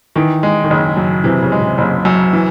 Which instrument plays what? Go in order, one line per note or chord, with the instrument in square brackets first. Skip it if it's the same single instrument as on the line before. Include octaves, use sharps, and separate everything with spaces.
[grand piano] D#3 [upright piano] E3
[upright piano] G#3
[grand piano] D#3
[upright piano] F#1 [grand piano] C#3
[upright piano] F#2
[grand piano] C3 [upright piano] E3
[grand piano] C#3
[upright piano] G#3
[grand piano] C3
[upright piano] F#1 [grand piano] C#3
[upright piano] F#2
E3